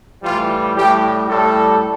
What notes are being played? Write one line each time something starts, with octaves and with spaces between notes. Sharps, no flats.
A2 E3 G3 F4
A2 G3 G4
A2 G3 A4